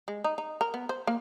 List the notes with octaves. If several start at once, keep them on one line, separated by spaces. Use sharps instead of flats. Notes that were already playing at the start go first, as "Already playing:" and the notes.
G#3
D#4
D#4
A#4
B3
C5
A#3